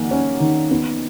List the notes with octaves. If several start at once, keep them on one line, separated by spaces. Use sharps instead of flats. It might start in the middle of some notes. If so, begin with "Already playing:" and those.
Already playing: D#3 A#3 F#5 G#5
C#4
D#3
B3